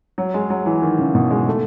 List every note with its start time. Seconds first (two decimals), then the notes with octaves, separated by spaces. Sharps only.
0.18 F#3
0.34 G#3
0.50 F#3
0.66 E3
0.82 D#3
0.99 C#3
1.15 B2
1.31 G#3
1.48 A3